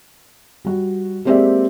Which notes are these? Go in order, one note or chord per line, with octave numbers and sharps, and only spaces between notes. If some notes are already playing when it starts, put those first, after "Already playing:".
G3 F#4
G#3 A#3 C4 G4 D5 E5